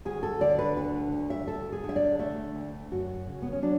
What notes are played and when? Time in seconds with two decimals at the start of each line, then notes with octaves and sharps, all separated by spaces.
0.05 D2 G#4
0.23 A4
0.41 D3 D5
0.59 B4
0.76 D2 B4
1.12 D2
1.30 E5
1.47 D2 A4
1.72 G#4
1.84 D3
1.89 E5
1.96 D5
2.19 A3 E5
2.55 D2
2.91 F#2 F#4
3.27 C#3
3.42 B3
3.52 C#4
3.62 F#3 D4